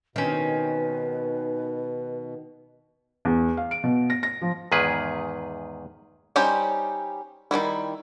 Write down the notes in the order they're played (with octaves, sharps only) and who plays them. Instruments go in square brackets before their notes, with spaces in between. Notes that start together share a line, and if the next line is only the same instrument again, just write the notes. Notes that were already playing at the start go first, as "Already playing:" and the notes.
[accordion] B2 [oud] D#3 [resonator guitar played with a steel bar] C4 C#4 [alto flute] B4
[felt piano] E2
F5
D7
B2
A#6
A#6
F3
[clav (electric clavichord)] E2 G#2 D#3 G#4 B4
[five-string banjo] G3 C#4 D#4 G4 C5
D#3 F#3 G3 E4